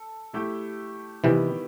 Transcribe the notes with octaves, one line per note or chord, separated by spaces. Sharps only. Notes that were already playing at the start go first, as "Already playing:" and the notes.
Already playing: A4
A3 E4 G4
C3 D#3 E3 G3 B3 E4 G4